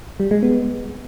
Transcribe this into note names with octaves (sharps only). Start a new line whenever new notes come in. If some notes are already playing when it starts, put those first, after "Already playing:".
G3
G#3
B3